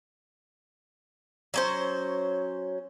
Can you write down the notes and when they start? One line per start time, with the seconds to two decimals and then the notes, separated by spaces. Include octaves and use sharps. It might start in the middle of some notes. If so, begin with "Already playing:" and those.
1.54 F#3 C#4 C5